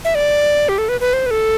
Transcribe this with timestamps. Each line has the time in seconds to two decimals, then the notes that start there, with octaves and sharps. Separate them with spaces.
0.05 E5
0.15 D5
0.69 G4
0.78 A4
0.89 B4
1.00 B4
1.13 C5
1.26 B4
1.31 A4